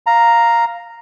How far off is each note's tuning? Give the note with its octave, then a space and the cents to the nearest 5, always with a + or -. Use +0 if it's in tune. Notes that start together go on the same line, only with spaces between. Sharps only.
F5 +0 A#5 +0